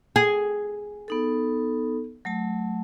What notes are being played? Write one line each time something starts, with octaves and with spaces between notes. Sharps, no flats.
G#4
B3 D#4 A4
F#3 A3 A5